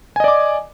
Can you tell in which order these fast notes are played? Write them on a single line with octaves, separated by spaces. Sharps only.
G#5 D#5 D5 D6